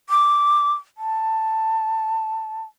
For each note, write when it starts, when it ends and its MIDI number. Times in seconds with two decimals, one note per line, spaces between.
0.09 0.72 86
0.98 2.62 81